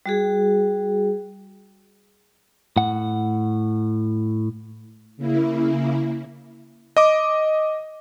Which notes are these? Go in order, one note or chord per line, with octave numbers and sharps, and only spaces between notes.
G3 F#4 G#4
A2 F#5
C#3 A#3 E4
D#5 D6